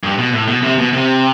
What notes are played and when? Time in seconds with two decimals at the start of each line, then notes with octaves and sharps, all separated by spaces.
0.04 G2
0.18 B2
0.33 A2
0.48 B2
0.63 C3
0.78 B2
0.93 C3